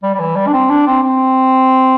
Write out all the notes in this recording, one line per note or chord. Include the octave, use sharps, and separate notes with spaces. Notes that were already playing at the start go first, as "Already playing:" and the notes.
G3
G3
E3
G3
D4
C4
D4
C4
C4